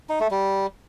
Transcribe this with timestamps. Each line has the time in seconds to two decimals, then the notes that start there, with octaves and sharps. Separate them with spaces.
0.09 D#4
0.20 A3
0.31 G3